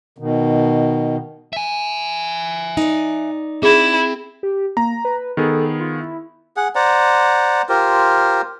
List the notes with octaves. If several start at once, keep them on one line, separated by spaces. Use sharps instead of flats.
B2 D#3
E5 G#5
D#4 D5
C4 E4 G#4
G4
A#3 A#5
B4
D#3 B3 G#4 A4
F4
E4
G#4 F#5
C5 D5 F#5 A#5
F4 G4 A#4 C5